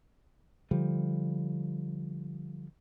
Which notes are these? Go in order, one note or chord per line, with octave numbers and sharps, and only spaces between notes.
D3 F3 G3